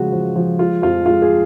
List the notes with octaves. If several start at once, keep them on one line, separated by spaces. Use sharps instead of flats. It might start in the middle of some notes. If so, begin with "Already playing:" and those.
Already playing: C#3 F3 G#3 F#4
F3
F3
G#3 F4
F2 F4
G#3 F4
G#4